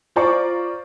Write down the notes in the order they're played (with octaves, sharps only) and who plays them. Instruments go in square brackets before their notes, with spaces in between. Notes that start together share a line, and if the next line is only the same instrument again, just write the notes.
[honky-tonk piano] F4 C5 D5 A#5 C#6 D6